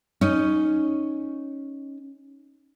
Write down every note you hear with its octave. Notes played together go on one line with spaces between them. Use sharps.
C#4 D#4